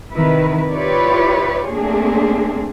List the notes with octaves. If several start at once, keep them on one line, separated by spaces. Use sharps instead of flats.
C3 D#3 E4 B4
E4 F4 G4 B4 C#5 D5
A3 A#3 C4 D4 G#4